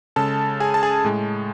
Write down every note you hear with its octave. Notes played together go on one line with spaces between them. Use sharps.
C#3 G#3 A4 A5
G#4 G#5
A5
G#4 G#5
A2 G#3